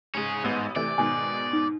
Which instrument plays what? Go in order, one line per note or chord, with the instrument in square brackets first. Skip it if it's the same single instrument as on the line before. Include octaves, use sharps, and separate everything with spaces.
[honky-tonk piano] G#2 G#3 [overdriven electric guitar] C#4 G#4
[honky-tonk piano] A1 B3 D#7 [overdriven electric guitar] G#2
[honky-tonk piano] C3 E3 A3 [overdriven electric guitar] D5
[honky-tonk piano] G#2 B2 D#3 [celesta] G#5
[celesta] D#4